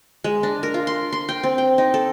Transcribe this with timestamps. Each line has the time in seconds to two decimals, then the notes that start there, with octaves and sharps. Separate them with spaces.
0.24 G#3
0.43 D4
0.63 A#4
0.74 F4
0.87 C6
1.12 C6
1.29 G5
1.43 C4
1.58 G5
1.78 D#4
1.94 A4